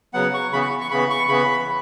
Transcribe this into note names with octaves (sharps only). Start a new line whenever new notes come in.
C#3 F#3 B3 F#5
C#6
C#3 E3 B3 B5
C#6
C#6
C#3 E3 B3 B5
C#6
C#3 E3 B3 B5